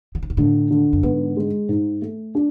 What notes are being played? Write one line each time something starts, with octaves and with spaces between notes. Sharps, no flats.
D3
C#3
B2
A2 D3
D3
F#2
G#2 B3
G#3
G#2
A3
D4